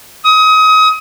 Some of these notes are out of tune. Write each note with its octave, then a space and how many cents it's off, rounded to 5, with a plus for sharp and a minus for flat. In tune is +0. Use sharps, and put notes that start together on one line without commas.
D#6 +30